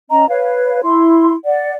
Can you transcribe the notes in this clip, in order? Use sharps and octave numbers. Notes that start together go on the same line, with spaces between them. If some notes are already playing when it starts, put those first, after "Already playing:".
C#4 D#5 A#5
B4 C#5 F5
E4 C6
D5 F#5